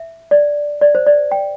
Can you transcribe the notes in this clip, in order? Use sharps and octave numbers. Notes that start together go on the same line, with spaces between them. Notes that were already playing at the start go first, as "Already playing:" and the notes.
Already playing: E5
D5
D5
C5
D5
G5